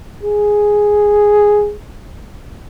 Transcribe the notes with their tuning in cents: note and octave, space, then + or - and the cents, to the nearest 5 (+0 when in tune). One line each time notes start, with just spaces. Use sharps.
G#4 +0